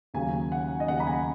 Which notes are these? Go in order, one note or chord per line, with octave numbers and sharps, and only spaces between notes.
D#2 C#3 F#3 G#5
F#5
D#5
D#2 C#3 F#3 F#5
B5
G#5